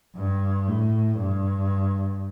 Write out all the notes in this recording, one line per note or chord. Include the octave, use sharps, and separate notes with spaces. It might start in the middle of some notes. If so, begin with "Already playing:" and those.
G2
A2
G2